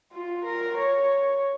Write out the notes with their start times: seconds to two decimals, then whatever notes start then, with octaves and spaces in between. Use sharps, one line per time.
0.13 F4
0.45 A#4
0.78 C#5